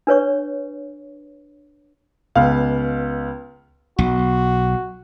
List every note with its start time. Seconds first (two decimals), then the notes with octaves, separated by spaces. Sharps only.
0.07 D4 B4 C#5 C#6
2.35 C#2 B3 F5
3.99 B1 F#4